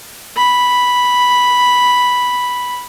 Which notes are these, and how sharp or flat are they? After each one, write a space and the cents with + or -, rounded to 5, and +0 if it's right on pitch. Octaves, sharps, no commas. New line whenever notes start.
B5 -5